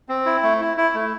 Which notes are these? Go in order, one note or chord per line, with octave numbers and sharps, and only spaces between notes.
C4
E4
A3
E4
E4
A3